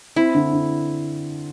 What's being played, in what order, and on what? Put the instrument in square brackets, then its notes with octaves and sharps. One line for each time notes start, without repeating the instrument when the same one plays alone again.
[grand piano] C4 [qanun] E4
[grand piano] D3
D3